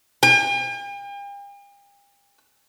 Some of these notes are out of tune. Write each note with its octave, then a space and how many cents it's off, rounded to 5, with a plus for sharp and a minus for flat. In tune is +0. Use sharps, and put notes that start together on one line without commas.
G5 +45